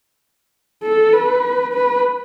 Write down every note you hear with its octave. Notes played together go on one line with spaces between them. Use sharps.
A4
B4
B4